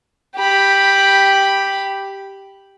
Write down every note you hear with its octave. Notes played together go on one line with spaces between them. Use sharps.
G4 B5